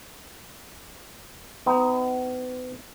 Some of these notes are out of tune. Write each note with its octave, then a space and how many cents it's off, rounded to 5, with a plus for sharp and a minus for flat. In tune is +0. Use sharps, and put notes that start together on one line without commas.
B3 +40 D#4 +5